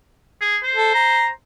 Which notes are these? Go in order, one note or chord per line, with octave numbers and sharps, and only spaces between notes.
G#4
C5
A4
A#5